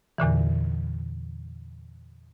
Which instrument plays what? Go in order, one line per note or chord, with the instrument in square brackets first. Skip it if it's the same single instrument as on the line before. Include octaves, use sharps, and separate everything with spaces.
[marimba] E2 A#2 D3 E3